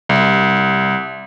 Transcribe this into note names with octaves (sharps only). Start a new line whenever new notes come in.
C2